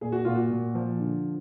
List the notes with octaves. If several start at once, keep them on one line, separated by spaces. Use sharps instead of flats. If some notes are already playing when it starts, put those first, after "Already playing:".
A#2 G#4
F#4
A#2 F4
F#4
A#2
F3
D3